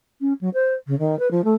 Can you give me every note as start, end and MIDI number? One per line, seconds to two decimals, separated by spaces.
0.21 0.33 61
0.41 0.49 54
0.54 0.74 72
0.87 0.97 49
0.99 1.18 51
1.19 1.28 71
1.31 1.44 53
1.44 1.54 57